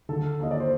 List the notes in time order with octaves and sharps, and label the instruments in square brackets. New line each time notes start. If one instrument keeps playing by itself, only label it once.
[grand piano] D3 A4
D#2 D#5
D5
C5